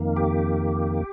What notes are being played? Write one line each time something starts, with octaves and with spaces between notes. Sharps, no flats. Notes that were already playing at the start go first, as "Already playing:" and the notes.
Already playing: F2 D#3 A#3
G4